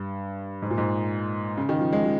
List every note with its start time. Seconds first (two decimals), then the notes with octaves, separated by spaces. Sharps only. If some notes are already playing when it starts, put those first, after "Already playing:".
Already playing: G2
0.62 G#2
0.70 A#2
0.78 G#2
1.57 C#3
1.69 D#3
1.80 F3
1.93 G#3
2.04 F3